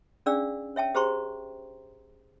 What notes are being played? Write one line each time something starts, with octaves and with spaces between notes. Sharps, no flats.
C#4 D4 G#4 D5 F5 E6
C#5 E5 G5 A5
G4 G#4 C5 A#5 C6 C#6